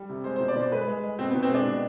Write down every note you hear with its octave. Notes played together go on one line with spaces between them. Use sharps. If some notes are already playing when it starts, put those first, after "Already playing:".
Already playing: G3
C3
G#3 C5
B2 C5
D5
B2 C5
G#3 B4
G#3
G#3
B2 C4
B2 B3
C4
G#3 D4
B2